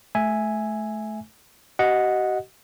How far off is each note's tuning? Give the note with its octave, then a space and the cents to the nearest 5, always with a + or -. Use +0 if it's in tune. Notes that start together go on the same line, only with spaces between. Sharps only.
A3 -25 E5 +0 G#5 +0
F#4 +45 D#5 +0 F#5 -10